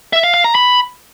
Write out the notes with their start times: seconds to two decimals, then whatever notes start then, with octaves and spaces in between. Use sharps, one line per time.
0.13 E5
0.23 F5
0.34 F5
0.44 A#5
0.55 B5